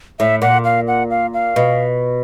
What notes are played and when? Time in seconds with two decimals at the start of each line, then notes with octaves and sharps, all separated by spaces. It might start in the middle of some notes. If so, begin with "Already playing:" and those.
0.20 A2 E5
0.42 A#2 F#5
0.64 F5
0.87 F#5
1.10 F5
1.34 F5
1.56 B2